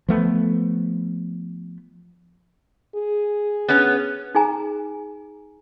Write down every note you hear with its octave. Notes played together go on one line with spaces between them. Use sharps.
F3 A3 B3
G#4
B3 C#4
D#4 G#4 G#5 A#5